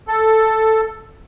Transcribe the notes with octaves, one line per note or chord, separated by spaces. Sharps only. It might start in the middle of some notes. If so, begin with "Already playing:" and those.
A4